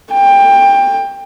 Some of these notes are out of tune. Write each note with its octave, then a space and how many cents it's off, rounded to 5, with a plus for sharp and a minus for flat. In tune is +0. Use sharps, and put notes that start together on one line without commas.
G5 +20